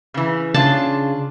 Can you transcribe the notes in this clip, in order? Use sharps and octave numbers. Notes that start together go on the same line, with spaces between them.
C#3 E3
C#3 D4 F4 A5